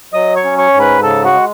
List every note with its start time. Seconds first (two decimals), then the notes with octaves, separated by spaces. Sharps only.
0.13 F#3 D#5 D#6
0.36 C#5 C#6
0.44 C#4
0.58 C#5 C#6
0.74 G#2
0.80 B4 B5
1.03 C#3 A4 A5
1.25 F#4 F#5
1.33 G#3